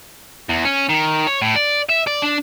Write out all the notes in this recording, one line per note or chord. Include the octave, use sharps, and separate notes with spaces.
E2
C#4
D#3
C#5
A2
D5
E5
D5
D4